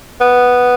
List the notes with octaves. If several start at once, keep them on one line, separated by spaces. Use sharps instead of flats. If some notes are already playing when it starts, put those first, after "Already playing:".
B3